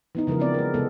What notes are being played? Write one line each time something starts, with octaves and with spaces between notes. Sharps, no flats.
E3 B3 D#4
C#3 E3 F3 G#3 A#4
G#3 B3 C4 D5
G#3 A#4
C3 E3 G#3 B3 A4